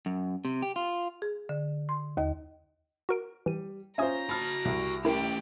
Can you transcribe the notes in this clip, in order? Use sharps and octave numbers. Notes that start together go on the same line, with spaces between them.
F#2
C3
G4
F4
G#4
D3
C6
D#2 D#5
F#4 A#4 D7
E3 G3 D#7
C#4 F4 C5 E5 G#5 A#5 D#6
F#4 A5 B5 F6
C2
A3 C#4 E4 G4 A#4